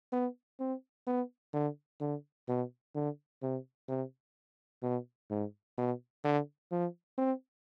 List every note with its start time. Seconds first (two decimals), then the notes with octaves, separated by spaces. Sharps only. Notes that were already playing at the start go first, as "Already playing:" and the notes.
0.12 B3
0.60 C4
1.07 B3
1.54 D3
2.01 D3
2.48 B2
2.95 D3
3.43 C3
3.89 C3
4.83 B2
5.30 G#2
5.78 B2
6.24 D3
6.71 F3
7.18 C4